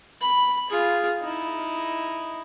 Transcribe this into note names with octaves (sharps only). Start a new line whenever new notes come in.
B5
F4 G#4
D#4 E4